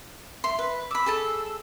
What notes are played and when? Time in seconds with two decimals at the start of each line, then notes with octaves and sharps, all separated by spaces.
0.44 E5 C6
0.59 B4
0.91 B5 D6 E6
1.06 G#4 A4 A5